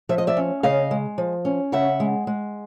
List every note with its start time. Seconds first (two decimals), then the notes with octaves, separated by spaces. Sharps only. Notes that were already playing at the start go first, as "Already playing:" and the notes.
0.09 F3 E5
0.18 D#5
0.27 D5 E5
0.37 C#4
0.63 C#3 D#5 F5
0.91 G#3
1.18 F3
1.45 C#4
1.72 C#3 E5 F#5
2.00 G#3
2.27 G#3